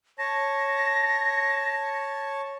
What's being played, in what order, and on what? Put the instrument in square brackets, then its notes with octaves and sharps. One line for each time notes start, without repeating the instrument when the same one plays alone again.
[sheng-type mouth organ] C#5 A5 [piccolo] A#6